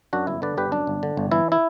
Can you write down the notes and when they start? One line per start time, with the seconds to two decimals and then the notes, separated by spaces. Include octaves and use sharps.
0.13 F#2 D4 F#4
0.27 G1 E4
0.42 D3 B4 D5
0.57 G1 G4 B4
0.72 F#2 D4
0.87 G1
1.03 D3
1.17 G1
1.31 E3 E4
1.52 E4